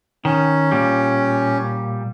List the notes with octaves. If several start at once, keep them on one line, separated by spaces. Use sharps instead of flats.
D#3 C#4
A#2 G3